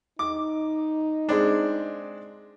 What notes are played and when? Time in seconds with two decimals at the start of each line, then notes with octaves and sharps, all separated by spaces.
0.19 D#4 D6
1.29 G#3 C4 D4